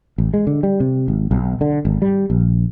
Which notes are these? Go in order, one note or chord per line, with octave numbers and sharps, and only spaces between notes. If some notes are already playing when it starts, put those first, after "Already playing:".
A1
G#3
D3
G3
C3
G#1
B1
D3
G#1
G3
A#1